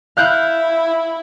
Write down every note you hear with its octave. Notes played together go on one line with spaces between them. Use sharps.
E4 F5 F#6 G6